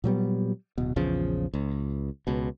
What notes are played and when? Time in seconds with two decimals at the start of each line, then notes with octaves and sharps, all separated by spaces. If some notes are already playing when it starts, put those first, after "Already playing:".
0.04 A#2 F#3 G3 B3
0.78 D1 B2
0.96 A#1 E2 C#3 F3
1.54 C#2
2.27 C#2 B2